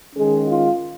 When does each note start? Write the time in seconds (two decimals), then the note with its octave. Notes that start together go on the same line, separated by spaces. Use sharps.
0.14 D#3 G#3 C#4 G#4
0.48 F4